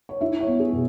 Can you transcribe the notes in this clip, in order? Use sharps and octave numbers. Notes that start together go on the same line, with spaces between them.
C#5
E4 E5
C#5
B3
G#4
B2